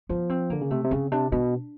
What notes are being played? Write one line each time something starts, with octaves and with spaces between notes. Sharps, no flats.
F3 B3
C4
D3 A#3
C#3
C3 A3
C3
C#3 C4
C3 D4
B2 D4